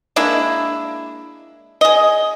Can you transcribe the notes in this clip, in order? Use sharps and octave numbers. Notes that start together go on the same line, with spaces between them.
G#3 A#3 D4 E4
G#4 D#5